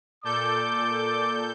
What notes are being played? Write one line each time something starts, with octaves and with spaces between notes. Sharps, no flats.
A#2 A4 D5 D6 G6